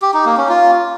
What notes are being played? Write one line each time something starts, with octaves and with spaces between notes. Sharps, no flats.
G4
D#4
A#3
C#4
F4